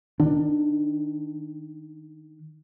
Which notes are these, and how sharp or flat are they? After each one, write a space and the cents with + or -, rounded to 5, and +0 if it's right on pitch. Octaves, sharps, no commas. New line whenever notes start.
D#3 +0 D4 +15